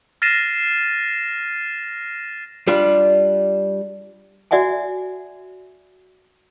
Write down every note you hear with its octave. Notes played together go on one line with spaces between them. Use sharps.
F6 A6 A#6 C7 D#7 E7
G3 D4 F4
F#4 D5 E5 F#5 G#5